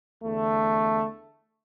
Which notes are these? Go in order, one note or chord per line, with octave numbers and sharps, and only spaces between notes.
E2 D3 A3